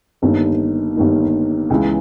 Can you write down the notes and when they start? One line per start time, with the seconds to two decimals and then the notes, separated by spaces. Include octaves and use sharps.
0.22 G1 G2 D#3 A#3 D#4
0.96 G1 G2 D#3 A#3 D#4
1.70 C#2 C#3 E3 G#3